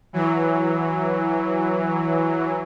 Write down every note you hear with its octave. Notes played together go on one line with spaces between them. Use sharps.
E3 F#3